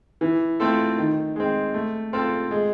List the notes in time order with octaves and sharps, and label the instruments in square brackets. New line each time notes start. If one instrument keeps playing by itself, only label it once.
[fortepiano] E3
A3 C4 F4 A4
D#3
G#3 C4
A3
C4 F4 A4
G#3